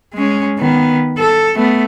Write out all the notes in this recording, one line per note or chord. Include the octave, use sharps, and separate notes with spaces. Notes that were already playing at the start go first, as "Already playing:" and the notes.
G#3 C#4
D#3 B3
A4
A3 B3